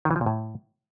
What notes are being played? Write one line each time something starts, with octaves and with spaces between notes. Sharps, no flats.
D#3
E3
F3
A#2
A2